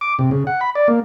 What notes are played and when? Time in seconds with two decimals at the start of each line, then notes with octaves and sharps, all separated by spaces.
0.01 D6
0.19 C3
0.31 C#3
0.47 F#5
0.61 B5
0.75 D5
0.88 A#3